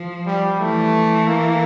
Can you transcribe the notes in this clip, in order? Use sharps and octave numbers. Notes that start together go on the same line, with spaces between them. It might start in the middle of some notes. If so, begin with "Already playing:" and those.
Already playing: F3
G3
E3 A3
A#3